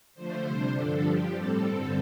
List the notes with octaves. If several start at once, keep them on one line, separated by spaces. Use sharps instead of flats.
D3 F3 A3 C5
C3 G3 D4 C5
G2 D3 F3 D4 A4
G2 F3 D4 G4
A2 G3 C4 A4
G2 D3 G3 C4